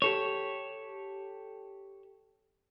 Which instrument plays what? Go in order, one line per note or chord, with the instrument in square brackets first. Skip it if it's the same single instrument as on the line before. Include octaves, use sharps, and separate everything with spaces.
[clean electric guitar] G4 A4 C#5